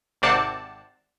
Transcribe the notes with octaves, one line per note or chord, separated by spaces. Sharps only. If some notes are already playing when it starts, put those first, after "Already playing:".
G#1 C3 C4 D5 F#5 A5